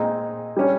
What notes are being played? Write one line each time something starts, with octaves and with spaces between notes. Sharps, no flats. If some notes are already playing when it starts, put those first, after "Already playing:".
Already playing: A#2 G#3 C4 D#4
G3 C#4